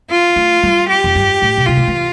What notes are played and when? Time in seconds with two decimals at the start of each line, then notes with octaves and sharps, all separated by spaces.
0.11 F4
0.36 A3
0.63 G3
0.89 G4
1.04 F2
1.15 G2
1.42 A2
1.58 B2
1.67 C3 F4
1.77 D3
1.88 E3